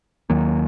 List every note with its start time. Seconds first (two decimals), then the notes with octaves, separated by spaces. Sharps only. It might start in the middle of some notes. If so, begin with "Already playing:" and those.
0.30 D#2 D#3 F#3 A#3